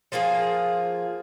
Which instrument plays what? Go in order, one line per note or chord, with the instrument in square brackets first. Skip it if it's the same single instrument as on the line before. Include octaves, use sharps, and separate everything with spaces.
[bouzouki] F3 A#3 F4 G#4